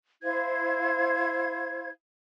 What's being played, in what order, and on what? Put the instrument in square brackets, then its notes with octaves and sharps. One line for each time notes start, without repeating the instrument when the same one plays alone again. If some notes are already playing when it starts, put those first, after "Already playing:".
[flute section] E4 C5 F5 G#6